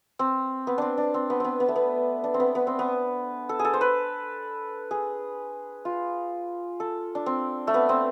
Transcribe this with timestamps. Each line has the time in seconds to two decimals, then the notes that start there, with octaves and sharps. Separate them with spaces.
0.19 C4
0.67 B3
0.78 C4 D4
0.98 D4
1.14 C4
1.30 B3
1.40 B3 C4
1.60 B3
1.68 A3
1.76 B3
2.24 D4
2.34 C4
2.40 B3
2.55 B3
2.67 C4
2.79 B3
3.49 A4
3.59 G#4
3.65 A4
3.74 C5
3.81 B4
4.91 G#4
5.85 F4
6.80 A4
7.15 D4
7.26 C4
7.67 A3
7.74 B3
7.89 C4